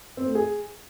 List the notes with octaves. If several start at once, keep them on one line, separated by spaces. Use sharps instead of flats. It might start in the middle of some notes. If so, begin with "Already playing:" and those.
C4
A3
G#4